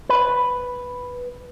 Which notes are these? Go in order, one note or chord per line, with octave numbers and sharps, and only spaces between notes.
B4